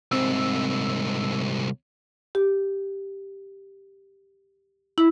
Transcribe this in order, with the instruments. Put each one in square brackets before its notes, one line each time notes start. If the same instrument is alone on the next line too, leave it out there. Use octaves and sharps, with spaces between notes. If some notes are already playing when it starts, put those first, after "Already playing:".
[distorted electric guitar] C2 G#2 [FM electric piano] C4 E6
[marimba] G4
E4